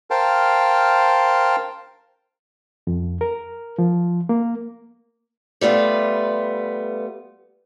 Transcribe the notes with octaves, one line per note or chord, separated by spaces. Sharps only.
A#4 C5 F5 G5 A5
F2
A#4
F3
A#3
G3 A3 B3 F4